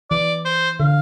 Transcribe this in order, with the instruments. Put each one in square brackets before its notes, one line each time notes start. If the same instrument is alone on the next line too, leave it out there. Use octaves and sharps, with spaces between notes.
[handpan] E3 [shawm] D5
[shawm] C5
[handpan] D3 [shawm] F5